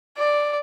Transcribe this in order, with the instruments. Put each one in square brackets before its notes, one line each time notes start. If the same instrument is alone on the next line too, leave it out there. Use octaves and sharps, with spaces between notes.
[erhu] D5